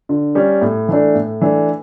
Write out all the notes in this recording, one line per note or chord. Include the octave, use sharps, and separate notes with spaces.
D3
G3 C#4
A2
E3 A3 D4
A2
E3 A3 D4